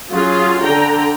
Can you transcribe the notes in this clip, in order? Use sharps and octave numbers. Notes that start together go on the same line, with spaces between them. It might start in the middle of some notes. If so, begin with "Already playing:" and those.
F#3 C#4 F4 G#4
D3 G5 A#5